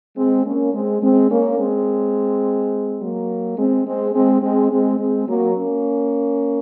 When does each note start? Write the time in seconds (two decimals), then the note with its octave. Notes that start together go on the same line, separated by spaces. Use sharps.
0.17 G#3 C4
0.45 A#3 C#4
0.74 G#3 C4
1.02 G#3 C4
1.30 A#3 C#4
1.59 G#3 C4
3.01 F#3 A#3
3.58 G#3 C4
3.86 G#3 C4
4.15 G#3 C4
4.43 G#3 C4
4.71 G#3 C4
4.99 G#3 C4
5.28 F#3 A#3
5.56 A#3 C#4